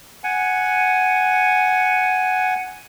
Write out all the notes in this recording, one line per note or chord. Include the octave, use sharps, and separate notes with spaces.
F#5 G#5